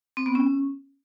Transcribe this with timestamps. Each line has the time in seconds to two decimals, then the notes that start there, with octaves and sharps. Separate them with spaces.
0.17 C4
0.26 B3
0.35 C#4